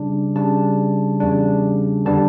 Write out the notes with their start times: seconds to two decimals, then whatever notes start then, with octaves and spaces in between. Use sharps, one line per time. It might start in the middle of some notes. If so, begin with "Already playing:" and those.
Already playing: C#3 G3 D4
0.35 C#3 G3 D4 A5
1.20 E2 C#3 G3 D4
2.05 D3 G3 B3 D4 A5